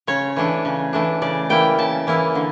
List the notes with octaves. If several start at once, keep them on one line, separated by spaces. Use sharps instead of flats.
C#3 C#5
E3 A3 D4
C#3
E3 A3 D4
C#3 D5
E3 A#3 E4 G5
C#3 A5
E3 A#3 E4
D3